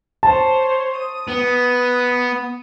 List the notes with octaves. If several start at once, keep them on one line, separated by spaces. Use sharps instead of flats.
C5 C#5 A5
D#6
B3